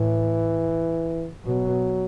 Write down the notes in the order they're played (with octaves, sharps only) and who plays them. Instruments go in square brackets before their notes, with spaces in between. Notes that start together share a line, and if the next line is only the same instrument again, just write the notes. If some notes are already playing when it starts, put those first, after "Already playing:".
Already playing: [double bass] A2 [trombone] E3
[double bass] B2 [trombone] F#3